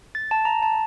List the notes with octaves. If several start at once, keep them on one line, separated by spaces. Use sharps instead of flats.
A6
A5
A#5
A5